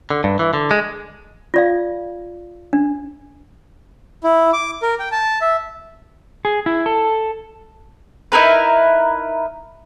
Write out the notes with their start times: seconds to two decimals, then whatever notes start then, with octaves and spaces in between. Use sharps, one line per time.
0.10 D3
0.24 G2
0.39 E3
0.54 D3
0.71 G#3
1.54 F4 D5 F5
2.73 D4
4.24 E4
4.53 D6
4.82 A#4
4.99 G5
5.12 A5
5.41 E5
6.45 G#4
6.66 E4
6.86 A4
8.32 D#4 E4 A#4 B4